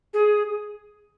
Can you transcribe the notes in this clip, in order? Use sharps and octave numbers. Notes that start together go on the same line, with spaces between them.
G#4